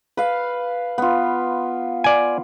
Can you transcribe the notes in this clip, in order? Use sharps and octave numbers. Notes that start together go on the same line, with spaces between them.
B4 F5
B3 F4
D5 G#5